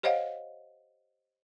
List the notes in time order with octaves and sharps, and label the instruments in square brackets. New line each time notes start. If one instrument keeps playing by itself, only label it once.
[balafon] G4 C5 C#5 D#5 F5 F#5